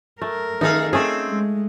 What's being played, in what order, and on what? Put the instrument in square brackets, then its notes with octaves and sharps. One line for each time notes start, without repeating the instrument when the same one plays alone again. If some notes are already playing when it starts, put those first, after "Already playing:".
[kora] A3 [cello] A#4
[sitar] D#3 G#4 [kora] D#4 A4 F5
[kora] A3 G#4 [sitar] C4 C#4
[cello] G#3